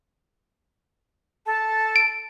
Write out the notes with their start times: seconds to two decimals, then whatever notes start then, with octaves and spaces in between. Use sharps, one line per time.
1.46 A4 A5
1.96 D7